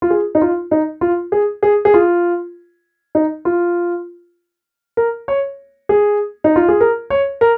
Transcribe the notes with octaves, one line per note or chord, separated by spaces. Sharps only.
F4
G#4
D#4
F4
D#4
F4
G#4
G#4
G#4
F4
D#4
F4
A#4
C#5
G#4
D#4
F4
G#4
A#4
C#5
A#4